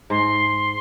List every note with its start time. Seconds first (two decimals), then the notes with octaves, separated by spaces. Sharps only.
0.10 G#2 C6